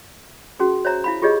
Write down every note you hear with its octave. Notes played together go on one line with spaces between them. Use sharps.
C#4 F#4 G#4
C5 C#5 E5 A#5
E4 F5 B5
F4 G4 G#4 C#5 D#5